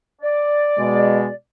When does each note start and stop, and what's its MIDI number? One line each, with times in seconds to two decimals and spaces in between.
0.22 1.34 74
0.77 1.27 47
0.77 1.27 56